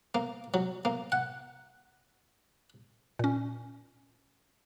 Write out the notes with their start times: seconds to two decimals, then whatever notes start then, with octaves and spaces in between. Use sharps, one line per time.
0.15 A#3
0.54 F#3
0.85 A#3
1.12 F#5
3.19 A#2 C#4